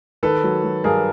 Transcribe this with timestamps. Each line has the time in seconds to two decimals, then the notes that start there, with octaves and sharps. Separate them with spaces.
0.23 D#3 A4 B4
0.44 F#3
0.64 F#3
0.84 G2 G#4 A#4